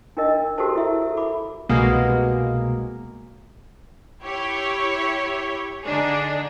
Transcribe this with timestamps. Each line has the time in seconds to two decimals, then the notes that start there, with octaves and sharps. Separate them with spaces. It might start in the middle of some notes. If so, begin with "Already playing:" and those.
0.17 D4 D#4 A#4 D#5
0.58 F#4 G4 A4 A#4 C5 A5
0.75 E4 E5
1.02 A4
1.17 B5 D6
1.69 C2 B2 G#3 A#3
4.22 E4 G4 C#5
5.83 D3 D4 D#4 G#4